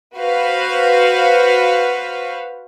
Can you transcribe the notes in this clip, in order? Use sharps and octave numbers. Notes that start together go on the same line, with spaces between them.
F#4 B4 C5 F5